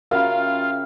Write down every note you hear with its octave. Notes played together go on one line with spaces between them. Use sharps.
C#3 F4 F#4 A#4 E5 F5 G5 B5